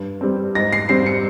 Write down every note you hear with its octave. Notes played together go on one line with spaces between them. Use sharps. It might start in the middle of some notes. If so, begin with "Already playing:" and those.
Already playing: G2
G3 C4
G#2 A#6
C7
G3 C4 C7
C#7